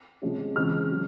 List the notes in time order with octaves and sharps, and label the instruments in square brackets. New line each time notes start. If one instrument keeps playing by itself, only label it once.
[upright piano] C3 F3 G#3 C#4
C#2 C#3 E3 G#3 C4 F6
C#3 F#3